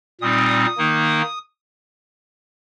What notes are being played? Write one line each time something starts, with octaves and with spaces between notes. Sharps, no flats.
A#2 G3 C4 D#4 D#6
D#3 A#3 D#4